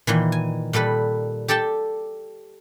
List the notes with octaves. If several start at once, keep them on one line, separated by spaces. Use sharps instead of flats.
A#2 D#3 E3
G#5
A#2 G3 A4 B4
G4 A4 D5 G5 A5